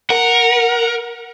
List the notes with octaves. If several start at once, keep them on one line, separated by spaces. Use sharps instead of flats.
A#4 F#5